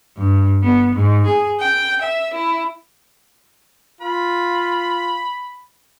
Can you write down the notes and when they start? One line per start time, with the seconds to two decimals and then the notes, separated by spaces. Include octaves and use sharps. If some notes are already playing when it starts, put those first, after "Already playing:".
0.17 G2
0.62 B3
0.95 G#2
1.27 G#4
1.60 G5
2.01 E5
2.34 E4
4.01 F4 B5